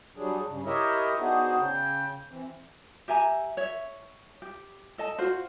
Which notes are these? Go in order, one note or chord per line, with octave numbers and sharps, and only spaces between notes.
F#3 G3 D4 G#4
G2 C#3
E4 G4 A#4 C#5 D#5 E5
B3 D4 D#4 F#4 G#4 C5
C#3 G5
E3 C4
G4 E5 G#5 A#5
C#5 E5
G4
A4 D#5 A5
F4 F#4 C5